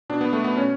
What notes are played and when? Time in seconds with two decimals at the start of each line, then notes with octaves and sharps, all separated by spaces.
0.10 B2 D4
0.21 B3
0.33 A3
0.44 B3
0.57 B2 C#4